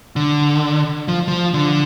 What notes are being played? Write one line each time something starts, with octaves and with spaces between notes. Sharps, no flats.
D3
F3
F3
D3